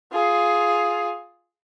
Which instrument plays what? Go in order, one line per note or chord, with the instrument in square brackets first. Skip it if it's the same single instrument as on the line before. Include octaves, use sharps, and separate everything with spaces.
[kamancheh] F4 G#4